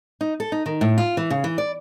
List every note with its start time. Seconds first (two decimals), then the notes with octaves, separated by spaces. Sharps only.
0.21 D#4
0.40 A4
0.52 D#4
0.66 D#3
0.81 A2
0.98 F4
1.17 E3
1.30 C#3
1.44 E3
1.58 D5